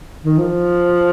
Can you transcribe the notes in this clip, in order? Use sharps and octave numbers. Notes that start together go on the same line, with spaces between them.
D#3
F3